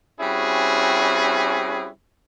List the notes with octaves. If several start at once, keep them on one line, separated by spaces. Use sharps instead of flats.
G3 C4 C#4 E4 F#4 G#4